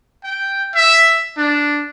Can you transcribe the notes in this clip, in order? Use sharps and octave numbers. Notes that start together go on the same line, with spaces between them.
G5
E5
D4